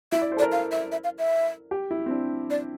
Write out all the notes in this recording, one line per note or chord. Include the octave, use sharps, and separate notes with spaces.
E4 E5
D5
C5
A4 D5
A#4
F5
E5
E5
F5
E5
G4
E4
C4
D4
D5